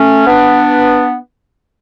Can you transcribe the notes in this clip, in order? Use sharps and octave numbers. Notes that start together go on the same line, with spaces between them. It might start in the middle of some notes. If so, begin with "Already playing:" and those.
Already playing: A3 C#4
B3 D4